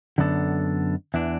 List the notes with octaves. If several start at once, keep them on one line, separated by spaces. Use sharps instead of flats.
F#2 D3 B3 D4 A4
E2 E3 D4